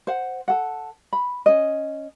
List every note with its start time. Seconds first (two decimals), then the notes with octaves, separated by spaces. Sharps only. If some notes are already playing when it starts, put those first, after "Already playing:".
0.07 C5 F#5
0.48 A4 F#5
1.13 B5
1.46 C#4 D#5